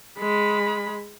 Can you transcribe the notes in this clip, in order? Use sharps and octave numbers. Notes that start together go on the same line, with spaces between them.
G#3 B5